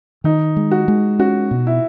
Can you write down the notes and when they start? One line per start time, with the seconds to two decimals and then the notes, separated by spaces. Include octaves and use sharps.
0.24 D#3 D#4
0.56 G#3
0.71 F#4
0.88 G#3
1.19 C#4 F#4
1.51 B2
1.67 E4